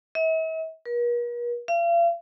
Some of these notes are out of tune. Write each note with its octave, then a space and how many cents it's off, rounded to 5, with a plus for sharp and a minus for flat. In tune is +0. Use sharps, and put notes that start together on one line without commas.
E5 -45
A#4 +45
F5 -40